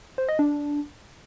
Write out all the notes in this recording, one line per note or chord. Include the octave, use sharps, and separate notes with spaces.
C5
D#5
D4